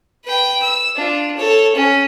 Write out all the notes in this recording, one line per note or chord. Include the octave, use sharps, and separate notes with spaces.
B4 G5
E6
D4 F4
A4 C#5
C#4